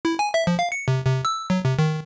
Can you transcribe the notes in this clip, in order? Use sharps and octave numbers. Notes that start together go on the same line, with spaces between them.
E4
G#5
E5
F3
F5
C#7
C3
C3
E6
F#3
C3
D#3